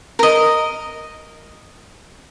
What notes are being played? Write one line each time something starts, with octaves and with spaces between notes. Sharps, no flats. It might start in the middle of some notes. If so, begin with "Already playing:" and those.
A#4 D#5